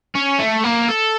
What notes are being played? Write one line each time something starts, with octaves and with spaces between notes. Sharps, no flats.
C#4
A3
A#3
A4